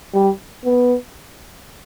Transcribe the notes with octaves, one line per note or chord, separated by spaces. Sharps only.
G3
B3